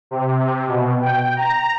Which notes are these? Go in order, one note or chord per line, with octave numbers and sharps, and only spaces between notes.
C3
B2
G5
A#5